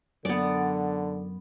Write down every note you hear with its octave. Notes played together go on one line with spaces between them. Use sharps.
F#2 D3 B3 D5